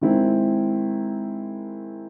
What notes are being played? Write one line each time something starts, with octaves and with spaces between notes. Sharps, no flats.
D#3 G#3 C4 E4